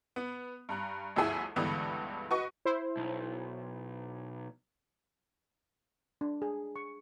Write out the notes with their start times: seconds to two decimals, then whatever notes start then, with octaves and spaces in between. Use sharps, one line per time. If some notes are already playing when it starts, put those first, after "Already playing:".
0.16 B3
0.69 G2 A#5 F#6
1.16 G1 D2 F3 E4 G#4 E5
1.56 C#2 G2 D3 E3 B3
2.31 F#4 B4 D#5 C#6
2.65 E4 C5
2.97 B1
6.21 D4
6.42 G#4
6.76 C#6